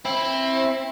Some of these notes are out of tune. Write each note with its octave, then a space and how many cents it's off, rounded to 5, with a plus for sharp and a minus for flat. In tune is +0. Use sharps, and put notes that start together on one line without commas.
C4 +25 E4 +0